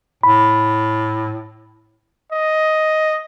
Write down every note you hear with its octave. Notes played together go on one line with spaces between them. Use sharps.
A2 B5
D#5